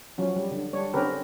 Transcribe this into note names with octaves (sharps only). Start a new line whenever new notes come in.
F3 F#3 C#4
G3
D3
G3 D4 C#5
D3 C4 C#4 G4 A#4 B4